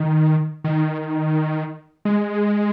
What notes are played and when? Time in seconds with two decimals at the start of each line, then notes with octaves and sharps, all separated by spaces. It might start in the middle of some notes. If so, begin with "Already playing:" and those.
Already playing: D#3
0.64 D#3
2.05 G#3